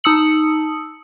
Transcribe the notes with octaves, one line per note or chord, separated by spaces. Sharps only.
D#4 A5 D#6 E6 C#7 F#7